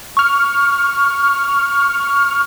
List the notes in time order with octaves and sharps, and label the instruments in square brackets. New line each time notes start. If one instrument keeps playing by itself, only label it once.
[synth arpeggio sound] C#6 F6